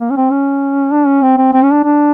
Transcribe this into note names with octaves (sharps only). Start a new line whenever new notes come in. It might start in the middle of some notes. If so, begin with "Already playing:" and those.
A#3
C#4
C4
C#4
D4
C#4
C4
C4
C4
C#4
D4
D4